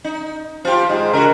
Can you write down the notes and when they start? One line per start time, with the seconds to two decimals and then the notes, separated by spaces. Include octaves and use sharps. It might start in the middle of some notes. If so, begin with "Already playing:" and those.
0.04 D#4
0.65 F3 F4 G4
0.89 G#2 G#3
1.13 C#3 F#4 A#4